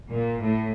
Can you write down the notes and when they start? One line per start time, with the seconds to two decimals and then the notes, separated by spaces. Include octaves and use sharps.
0.12 A#2
0.40 A2